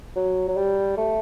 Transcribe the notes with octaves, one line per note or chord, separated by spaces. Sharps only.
F#3
F#3
G3
A3